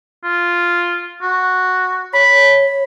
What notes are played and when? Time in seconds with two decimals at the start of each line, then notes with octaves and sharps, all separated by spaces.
0.24 F4
1.22 F#4
2.13 C#5 B5